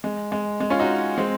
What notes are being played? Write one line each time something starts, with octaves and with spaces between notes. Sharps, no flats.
G#3
G#3
G#3
C#4 F4
D#4 F#4
G#3 C4